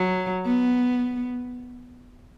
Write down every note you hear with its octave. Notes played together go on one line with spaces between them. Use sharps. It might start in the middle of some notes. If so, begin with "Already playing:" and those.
Already playing: F#3
B3